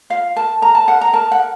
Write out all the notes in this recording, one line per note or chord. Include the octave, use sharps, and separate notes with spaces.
F4 F5
A#4 A5
A#4 A#5
A5
A#4 F#5
A#5
A#4 A5
F#5
A#4